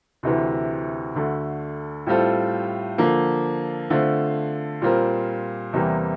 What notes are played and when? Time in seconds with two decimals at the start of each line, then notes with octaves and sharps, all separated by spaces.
0.23 D2 C3 E3
1.15 D2 D3 A3
2.06 A2 G3 C4 F4 A4
2.98 D3 F3 A#3
3.90 D3 A3 C4 F4
4.82 A#2 G3 C4 F4 A#4
5.73 E2 C3 E3 G3 A#3